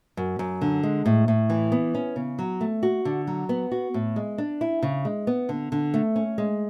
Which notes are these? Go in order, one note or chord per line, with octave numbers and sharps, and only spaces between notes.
F#2
F#2
D3
G#3
A2
A2
E3
B3
C#4
C#3
F#3
A3
F#4
D3
F#3
B3
F#4
A2
G#3
D4
E4
C#3
G#3
B3
D3
D3
A3
C#4
G#3